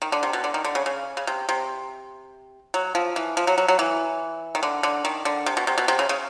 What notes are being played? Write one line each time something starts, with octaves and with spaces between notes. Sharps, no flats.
D#3
D3
C3
B2
D3
D#3
D3
C#3
C#3
C#3
C3
C3
F#3
F3
E3
F3
F#3
F#3
F#3
E3
D#3
D3
D3
D#3
D3
C3
B2
C3
B2
C3
C#3
C#3